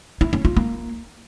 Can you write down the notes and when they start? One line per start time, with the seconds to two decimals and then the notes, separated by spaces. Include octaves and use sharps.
0.21 E4
0.33 C#4
0.45 F4
0.57 A#3